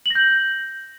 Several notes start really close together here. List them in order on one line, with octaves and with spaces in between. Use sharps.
F#7 A#6 G6